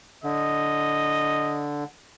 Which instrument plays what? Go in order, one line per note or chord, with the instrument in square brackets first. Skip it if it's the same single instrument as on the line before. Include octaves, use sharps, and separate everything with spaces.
[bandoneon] D3 [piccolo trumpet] D#5